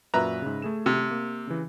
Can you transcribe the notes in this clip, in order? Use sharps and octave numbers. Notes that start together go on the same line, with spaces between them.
F#2 A#2 F#4 B4 E5 A#5
G#2 C#3
A3 G#4 E7
C3
A#3
C#3 E3